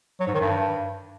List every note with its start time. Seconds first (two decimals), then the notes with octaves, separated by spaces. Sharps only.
0.20 F#3
0.27 G#2
0.34 D#3
0.41 G2